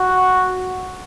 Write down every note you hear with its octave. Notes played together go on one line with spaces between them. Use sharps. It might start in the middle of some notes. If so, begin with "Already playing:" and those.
Already playing: F#4